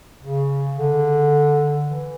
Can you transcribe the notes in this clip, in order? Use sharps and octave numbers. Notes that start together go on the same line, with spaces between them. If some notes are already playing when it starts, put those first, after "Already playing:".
C#3
D3
E3